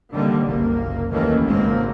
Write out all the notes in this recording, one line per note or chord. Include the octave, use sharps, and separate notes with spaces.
D3 D#3 G3 A#3 C4
F#1 C2 A#3
D#2 D#3 E3 A3 A#3 C#4
G#1 G#2 C#3 F#3 A#3 C4